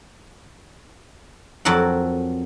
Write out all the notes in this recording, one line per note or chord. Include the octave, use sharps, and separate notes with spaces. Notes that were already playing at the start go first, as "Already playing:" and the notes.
F2 F#3 A4 A#4 F#5